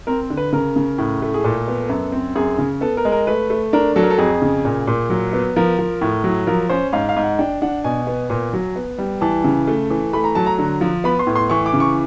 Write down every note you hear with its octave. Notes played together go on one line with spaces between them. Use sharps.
C4 A#4
D3
B4
C#3 A#4
C#3
A2
A3
G#4
A#2 A4
B3
F#2
C4
F#2 G#4
C#3
B3 A4
A#4
G#3
A#4
A3 B4
A3
D4 A#4
F#3 A4
A#4
A4
F2 G#4
C#3
A#2
A#2
F#3
B3
F3 A#4
F3
A2
F#3
F3 A#4
C#4 C5
G#2 F5
F5
G#2
F#5
D4 G5
D4 F#5
B2 G#5
B3
A#2
F#3
B3
G3
E3 A5
C#3
A3
E3
A3 B5
A#5
F#3 A5
A#5
D3
F3
B3 B5
C6
A2
C6
E3 C#6
D6
C#3
C#6